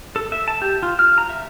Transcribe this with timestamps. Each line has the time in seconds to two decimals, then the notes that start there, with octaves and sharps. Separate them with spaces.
0.16 A4
0.32 E5
0.48 A5
0.62 G4
0.83 F4
0.99 F6
1.18 A#5
1.30 E5